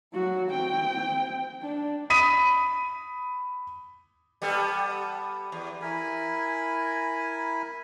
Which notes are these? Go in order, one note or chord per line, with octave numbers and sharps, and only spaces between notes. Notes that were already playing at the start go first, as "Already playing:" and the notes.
F#3 F#4
C4 G5
D4
B5 D#6 B6 D#7
G3 B3 A4
E2
E4 A#4 G#5 B5